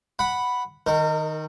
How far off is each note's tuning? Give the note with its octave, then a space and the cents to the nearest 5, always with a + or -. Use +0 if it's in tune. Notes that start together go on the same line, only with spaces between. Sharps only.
F#5 +0 B5 +0
D#3 +0 A#4 -35